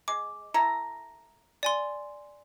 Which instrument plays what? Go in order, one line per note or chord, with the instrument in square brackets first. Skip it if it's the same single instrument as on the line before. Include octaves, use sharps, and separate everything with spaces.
[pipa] G#3 [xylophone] D6
[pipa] E4 A4 A#5
[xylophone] D5 G#5 C6